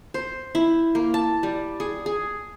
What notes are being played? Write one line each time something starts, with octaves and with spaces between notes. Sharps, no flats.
C5
E4
A#3
A5
G3
G#4
G#4